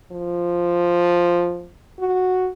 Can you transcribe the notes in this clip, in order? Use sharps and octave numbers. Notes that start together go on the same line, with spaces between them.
F3
F#4